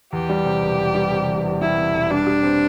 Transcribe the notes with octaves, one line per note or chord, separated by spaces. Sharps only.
E2 G4
G3
C3
E1
E2
G3
C3
E1
E2
G3 E4
C3
E1
G3 D4
G4
C4